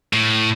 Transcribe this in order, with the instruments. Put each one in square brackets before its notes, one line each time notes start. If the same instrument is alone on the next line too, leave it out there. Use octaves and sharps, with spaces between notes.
[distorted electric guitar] A2